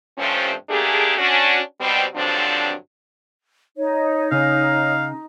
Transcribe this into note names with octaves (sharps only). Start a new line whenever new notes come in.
G2 C3 F3 A3 C4 C#4
A3 A#3 D4 G4 G#4
C#4 D4 F#4
B2 G3 C4
G2 D3 F3 F#3 C4 D4
D#4 C#5
C#3 C#5 F5